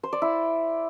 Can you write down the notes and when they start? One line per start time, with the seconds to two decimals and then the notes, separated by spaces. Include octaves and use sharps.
0.03 C5
0.13 D5
0.22 E4